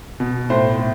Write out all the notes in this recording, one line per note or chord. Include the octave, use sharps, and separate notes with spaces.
B2
A2 C5
A2